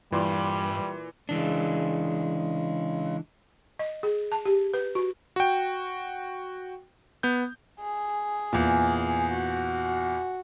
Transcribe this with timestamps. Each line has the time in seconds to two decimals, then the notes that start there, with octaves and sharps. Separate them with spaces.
0.12 G2 A#2 E3 G3 C6 D6
1.29 C#3 E3 G#3 D4
3.79 D#5
4.03 G#4
4.32 A5
4.45 G4
4.74 B4
4.95 F#4
5.36 F#4 G5
7.23 B3 G6
7.80 G#4
8.53 E2 A#2
9.31 F#4